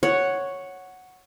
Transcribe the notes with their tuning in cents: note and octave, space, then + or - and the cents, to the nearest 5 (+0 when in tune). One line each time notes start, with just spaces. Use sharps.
C#5 +0 F#5 +0